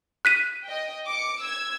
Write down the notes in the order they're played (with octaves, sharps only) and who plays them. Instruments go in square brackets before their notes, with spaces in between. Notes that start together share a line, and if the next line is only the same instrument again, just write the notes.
[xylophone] F#6 B6 D#7
[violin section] D#5 G5
D6 C#7
E6 G#6